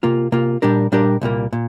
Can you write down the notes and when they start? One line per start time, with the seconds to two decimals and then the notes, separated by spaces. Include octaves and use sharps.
0.03 C3 A#3 F4
0.32 C3 A#3 F4
0.62 A#2 G3 D4 G4 A#4
0.92 A#2 G3 D4 G4 A#4
1.21 C2 A#2 G3 A#3
1.53 A#2